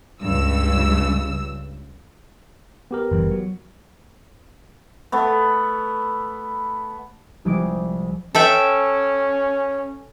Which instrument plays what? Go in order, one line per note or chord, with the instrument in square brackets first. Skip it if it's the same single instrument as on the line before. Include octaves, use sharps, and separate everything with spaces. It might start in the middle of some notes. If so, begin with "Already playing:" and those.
[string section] C#2 G2 C#3 E6
[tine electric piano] B3 G4 A#4
[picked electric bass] F#1 E3 G3
F#3
[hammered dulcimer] A3 B3
[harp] C2 F3 G3 G#3 D6 D7
[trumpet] C#4 [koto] A4 E5 G5